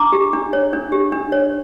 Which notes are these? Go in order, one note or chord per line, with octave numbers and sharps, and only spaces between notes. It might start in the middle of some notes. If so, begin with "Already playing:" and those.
Already playing: D4 A#5 D6
G4
D4
C#5
D4
G4
D4
C#5